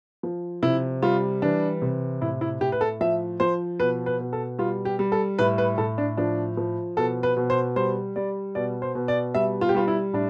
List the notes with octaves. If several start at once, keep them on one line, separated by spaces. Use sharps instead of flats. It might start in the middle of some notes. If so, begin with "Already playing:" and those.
F3
C3 E4
G3 F4
E3 D4
C3
A2 E4
E4
A2 G4
B4
A4
F3 E5
F3 C5
B2 B4
B4
B2
A4
G3 F4
G4
G3
A4
A2 B4
B4
A2 A4
D4
F3 D4
F3
B2 A4
B4
B2
C5
G3 C5
G3 D5
B2 D5
C5
B2
D5
G3 E5
F4
G4
G3 F4
E4
A2 D4